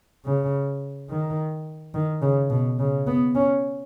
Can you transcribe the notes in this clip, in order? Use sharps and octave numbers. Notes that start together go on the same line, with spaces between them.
C#3
D#3
D#3
C#3
B2
C#3
B3
C#4